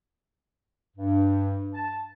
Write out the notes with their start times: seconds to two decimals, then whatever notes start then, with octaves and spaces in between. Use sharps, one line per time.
0.96 G2
1.75 A5